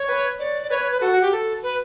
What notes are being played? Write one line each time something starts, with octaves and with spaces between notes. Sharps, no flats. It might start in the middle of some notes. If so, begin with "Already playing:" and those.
Already playing: C#5
B4
C#5 D5
D5
B4 C#5
C#5
B4
F#4 A4
F#4
G4
A4
B4